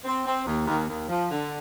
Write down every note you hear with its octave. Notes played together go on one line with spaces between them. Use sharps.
C4
C4
D#2
D#2
D#2
F3
D3